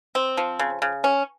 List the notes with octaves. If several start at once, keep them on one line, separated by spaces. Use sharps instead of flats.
C4
F3
C#3
C#3
C#4